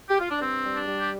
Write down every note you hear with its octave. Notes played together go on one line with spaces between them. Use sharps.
G4
F4
D4
G2 C4
G3
D4
G3
G4